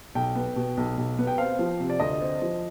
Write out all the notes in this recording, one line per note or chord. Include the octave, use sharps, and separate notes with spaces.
B1 G5
B3
B2
B1
B1
B3
G5
C4 F5
F3
C3
D5
D2 D#5
C4
F3